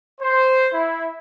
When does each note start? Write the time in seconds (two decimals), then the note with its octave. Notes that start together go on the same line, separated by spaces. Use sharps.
0.21 C5
0.72 E4